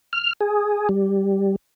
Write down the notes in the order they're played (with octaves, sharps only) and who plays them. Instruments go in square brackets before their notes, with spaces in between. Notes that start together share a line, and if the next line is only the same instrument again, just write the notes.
[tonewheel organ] F6
G#4
G3